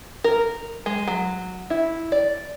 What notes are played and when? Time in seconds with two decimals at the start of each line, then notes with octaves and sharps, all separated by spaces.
0.24 A#4
0.86 G#3
1.08 F#3
1.70 E4
2.12 D5